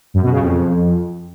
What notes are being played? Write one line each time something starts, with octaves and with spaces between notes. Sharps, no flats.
F#2
B2
C#3
F2